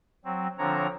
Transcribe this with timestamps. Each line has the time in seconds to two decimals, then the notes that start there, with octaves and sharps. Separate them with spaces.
0.25 F#3 C4
0.58 D3 F3 C4 D4 C#5 A#5